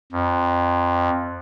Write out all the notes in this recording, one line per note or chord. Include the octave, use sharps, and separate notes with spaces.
F2